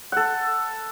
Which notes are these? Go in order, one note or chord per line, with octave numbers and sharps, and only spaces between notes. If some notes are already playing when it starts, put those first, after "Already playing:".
A4 F#5